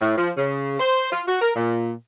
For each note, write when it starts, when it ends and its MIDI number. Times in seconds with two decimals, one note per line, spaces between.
0.01 0.17 45
0.18 0.30 53
0.37 0.80 49
0.80 1.09 72
1.12 1.22 65
1.28 1.39 66
1.42 1.51 70
1.56 1.92 46